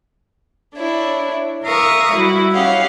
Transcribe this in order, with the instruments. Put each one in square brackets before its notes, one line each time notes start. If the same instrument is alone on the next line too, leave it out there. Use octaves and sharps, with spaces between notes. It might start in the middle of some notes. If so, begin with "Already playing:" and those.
[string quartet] D4 E4 C#5
A#4 E5 F5 C#6 D#6
G3 E4 F#4
C#4 G4 D#5 F5 F#5